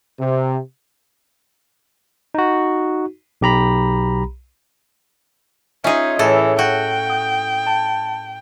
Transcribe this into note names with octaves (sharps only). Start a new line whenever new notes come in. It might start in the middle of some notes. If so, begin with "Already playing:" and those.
C3
D#4 F#4
B1 G4 A#5 B5
C#4 D#4 F4 G#4 D#5 E5
A2 E3 G#4 A4 C#5
F#4 G5
D#6 G6
A5